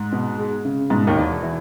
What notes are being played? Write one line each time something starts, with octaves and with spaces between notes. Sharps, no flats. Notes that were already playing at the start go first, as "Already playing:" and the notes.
Already playing: G#2
B2
G#3
C#3
G#2 B2
D#2 D#3
E2
E3